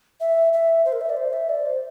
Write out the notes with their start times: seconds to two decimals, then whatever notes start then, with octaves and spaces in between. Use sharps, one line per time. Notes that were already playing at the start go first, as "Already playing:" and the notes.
0.20 E5
0.53 E5
0.85 C5
0.93 A#4
1.01 E5
1.10 D5
1.17 C5
1.33 E5
1.49 D5
1.66 C5